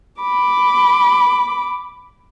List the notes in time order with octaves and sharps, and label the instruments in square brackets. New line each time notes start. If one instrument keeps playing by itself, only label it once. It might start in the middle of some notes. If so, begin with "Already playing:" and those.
[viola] B5 D6